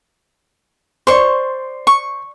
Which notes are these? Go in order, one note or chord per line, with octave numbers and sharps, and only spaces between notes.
C5 D5 C6 C#6
C#6